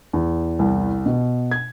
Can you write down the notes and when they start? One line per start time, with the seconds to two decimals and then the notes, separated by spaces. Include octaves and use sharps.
0.13 E2
0.59 C2
1.06 B2
1.51 G#6